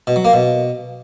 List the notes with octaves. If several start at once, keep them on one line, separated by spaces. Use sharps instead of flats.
B2
F#3
A#3
B2